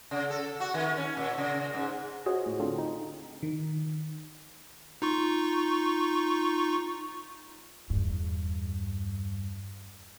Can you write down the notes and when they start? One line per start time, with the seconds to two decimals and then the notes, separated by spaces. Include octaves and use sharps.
0.11 C#3
0.30 A4
0.60 F#4
0.74 D#3
0.97 C#4
1.17 A#2
1.38 C#3
1.74 G#2
2.26 F4 F#4 G#4 C5 C#5 D#5
2.46 A2
2.59 A2 D3 C4 D4 F4
2.78 D#4
3.43 D#3
5.02 D#4 F4 C#6
7.90 E2 G2